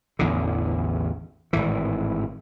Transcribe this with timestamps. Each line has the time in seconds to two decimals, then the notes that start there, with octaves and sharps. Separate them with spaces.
0.19 A1 E2 D3
1.53 G#1 A2 E3